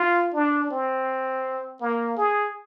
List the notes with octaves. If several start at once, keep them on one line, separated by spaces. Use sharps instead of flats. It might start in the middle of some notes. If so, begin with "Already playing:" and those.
Already playing: F4
D4
C4
A#3
G#4